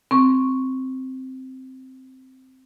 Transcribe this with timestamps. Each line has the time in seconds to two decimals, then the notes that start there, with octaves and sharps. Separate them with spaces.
0.11 C4 C#6